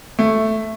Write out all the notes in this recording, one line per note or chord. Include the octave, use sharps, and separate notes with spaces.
A3